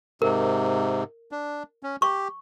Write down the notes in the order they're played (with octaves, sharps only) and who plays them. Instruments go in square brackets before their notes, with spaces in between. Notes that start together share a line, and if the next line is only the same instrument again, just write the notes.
[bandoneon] G#2 C3 [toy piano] A#4
[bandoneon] D4
C#4
[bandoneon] G4 [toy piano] C#6